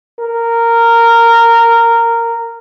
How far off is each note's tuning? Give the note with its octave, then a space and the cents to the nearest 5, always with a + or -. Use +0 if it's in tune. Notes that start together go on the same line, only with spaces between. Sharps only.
A#4 -10